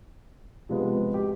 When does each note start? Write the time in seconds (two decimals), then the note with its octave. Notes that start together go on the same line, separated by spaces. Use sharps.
0.69 C3 F3 G#3 B3
1.14 G4